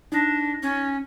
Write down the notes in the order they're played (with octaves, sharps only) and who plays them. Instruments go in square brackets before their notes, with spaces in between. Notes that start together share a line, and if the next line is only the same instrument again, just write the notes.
[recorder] D4 [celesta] D#4 A#6
[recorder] C#4